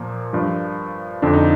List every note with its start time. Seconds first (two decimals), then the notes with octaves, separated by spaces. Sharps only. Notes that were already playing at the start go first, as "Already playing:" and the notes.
Already playing: A#2 F3 A#3
0.33 G2 F3
1.22 F2 D3 F3 D4
1.33 D#4